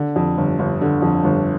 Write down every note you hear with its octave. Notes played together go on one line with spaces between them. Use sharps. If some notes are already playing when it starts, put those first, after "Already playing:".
Already playing: D3
F2
G1
G1
D3
F2
G1